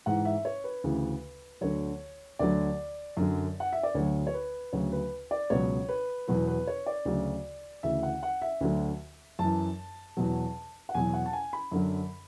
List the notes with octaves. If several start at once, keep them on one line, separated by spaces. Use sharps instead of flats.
G#2 E3 F#5
E5
C#5
B4
D2 C#3 E3
D2 D3 F#3 C#5
D2 D3 F#3 D5
F#2 D3 F#3
F#5
E5
D5
D2 D3 F#3 C#5
C#5
B4
D2 C#3 F#3 C#5
B4
D5
C#2 B2 F#3 C#5
B4
E2 B2 F#3 B4
B4
C#5
D5
D2 C#3 F#3
D2 C#3 E3 E5
F#5
F#5
E5
D2 D3 F#3
F#2 E3 A5
E2 B2 F#3
F#5
E2 B2 F#3 G#5
F#5
A5
G#5
B5
F#2 D3 F#3